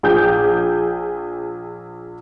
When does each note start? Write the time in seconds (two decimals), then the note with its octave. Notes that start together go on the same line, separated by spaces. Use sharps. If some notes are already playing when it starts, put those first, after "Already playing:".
0.03 A#1 G#4 G5 G#5 D6 G6